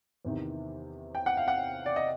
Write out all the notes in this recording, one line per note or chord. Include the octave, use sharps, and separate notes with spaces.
E2 C3 D#3
G5
F#5
F5
F#5
D5
D#5